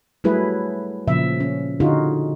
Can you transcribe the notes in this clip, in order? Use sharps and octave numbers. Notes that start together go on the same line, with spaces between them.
F#3 G3 A3 E4 G#4 B4
A#2 C#3 F3 E5
C#4
D3 D#4 F4 F#4 G#4